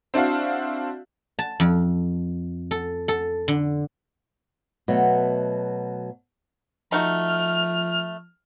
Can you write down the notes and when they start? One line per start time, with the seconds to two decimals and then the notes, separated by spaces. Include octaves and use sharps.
0.14 C4 D4 E4 F#4 F5
1.39 A5
1.60 F2
2.71 A4
3.08 A4
3.48 D3
4.88 B2 F#3 A3
6.92 F3 A3 D#4 F#4 F6